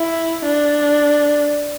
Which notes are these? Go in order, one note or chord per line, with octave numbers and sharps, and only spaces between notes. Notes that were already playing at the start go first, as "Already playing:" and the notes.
Already playing: E4
D4